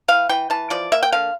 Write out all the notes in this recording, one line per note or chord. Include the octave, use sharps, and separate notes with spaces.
E3 F5
E3 G5
E3 A5
F3 D5
A#3 E5
G5
D3 F5